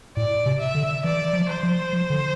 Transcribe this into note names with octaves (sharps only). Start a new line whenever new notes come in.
A2 D5
C3
E5
D3
E3 D5
F3
C5
F3
F3
D3